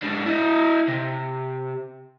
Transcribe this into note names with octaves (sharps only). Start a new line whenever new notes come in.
G#2 D4
E4 D#5
C3